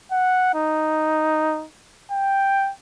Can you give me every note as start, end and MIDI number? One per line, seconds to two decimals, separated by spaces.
0.12 0.53 78
0.55 1.65 63
2.11 2.71 79